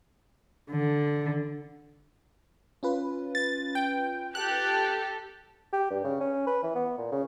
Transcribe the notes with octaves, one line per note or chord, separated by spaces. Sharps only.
D3
C#4 F4 B4
A6
G5
G4 A4 F#6
G4
G2
C#3
C#4
B4
E3
B3
A#2
C#3